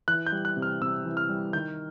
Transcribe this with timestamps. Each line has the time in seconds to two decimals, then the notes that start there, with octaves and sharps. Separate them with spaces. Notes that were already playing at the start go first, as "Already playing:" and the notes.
0.08 E3 F#6
0.27 G6
0.32 G3
0.45 F#6
0.57 C3
0.62 F6
0.82 C3 E6
1.05 E3
1.17 F6
1.29 G3
1.53 D#3 G6